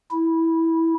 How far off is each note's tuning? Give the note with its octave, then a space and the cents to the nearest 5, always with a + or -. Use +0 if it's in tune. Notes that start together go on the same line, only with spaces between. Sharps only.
E4 -10